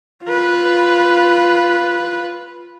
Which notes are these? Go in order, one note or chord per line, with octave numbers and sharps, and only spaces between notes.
F4 B4